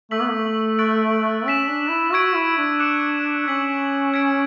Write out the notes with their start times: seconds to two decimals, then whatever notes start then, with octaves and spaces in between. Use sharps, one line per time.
0.11 A3 C#6 E6 B6 F#7
0.21 B3
0.30 A3
0.79 C#6 F#6 A6 D7 F#7
1.46 C#4 E6 B6 E7
1.69 D4
1.90 E4
2.13 F#4 C#6 E6 G#6 D7
2.36 E4
2.58 D4
2.79 D6 F#6 C#7 E7
3.47 C#4 E6 G#6 B6 F#7
4.14 G#6 B6 D7